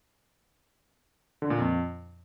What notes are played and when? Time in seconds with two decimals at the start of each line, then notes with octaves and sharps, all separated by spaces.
1.42 D3
1.50 A#2
1.58 F2